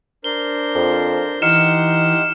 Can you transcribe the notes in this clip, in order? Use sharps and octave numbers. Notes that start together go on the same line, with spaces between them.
D4 A#4 C5 G7
F2
E3 D#4 G4 F#5 C6 F6 C#7 E7